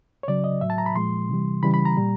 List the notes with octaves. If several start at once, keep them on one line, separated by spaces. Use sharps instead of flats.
C#5
C#3 F#3 D5
D#5
A2 F#3 E5
A5
A#5
B5
A#2 F3 G#3 C6
C3 E3 G3
C#3 E3 G3 B5
B5
A#5
A#2 G3